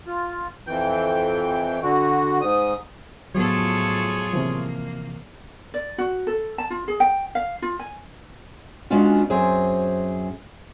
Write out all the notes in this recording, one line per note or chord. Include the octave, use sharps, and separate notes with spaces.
F4
F2 E3 G5
D3 F#4
G#2 D#6
A2 F3 F#3 B3 F4 G#4 A4 C#5
C3 E3 F3 A#3
D5
F#4
A4
A5
F4
G#4
G5
F5
F4
G#5
G#3 B3 C#4 D4 F4 F#4
F#2 C4 G#4 C5 G#5